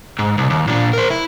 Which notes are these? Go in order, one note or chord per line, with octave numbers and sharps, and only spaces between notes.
G#2
C2
D#2
A#2 D4
A#4 C5
E4